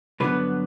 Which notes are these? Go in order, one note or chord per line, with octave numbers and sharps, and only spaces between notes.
G2 D3 F#3 B3 B4